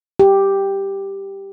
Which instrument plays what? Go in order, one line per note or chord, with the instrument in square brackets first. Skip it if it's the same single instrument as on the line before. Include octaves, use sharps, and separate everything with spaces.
[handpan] G4